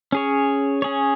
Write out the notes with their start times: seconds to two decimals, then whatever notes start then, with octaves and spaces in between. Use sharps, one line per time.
0.12 C#4 G#4 C#5
0.82 C#4 G#4 C#5